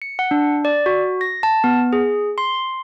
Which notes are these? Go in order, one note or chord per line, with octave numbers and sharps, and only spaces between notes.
C#7
F#5
D4
D5
F#4
A#6
A5
B3
G#4
C6